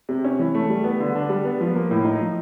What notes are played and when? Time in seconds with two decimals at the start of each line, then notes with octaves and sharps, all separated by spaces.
0.09 C3
0.24 C#4
0.39 E3
0.55 A3
0.69 G3
0.84 B3
1.00 D3
1.15 D4
1.29 G3
1.45 B3
1.61 F3
1.75 A#3
1.91 A2
2.05 D#4
2.20 F3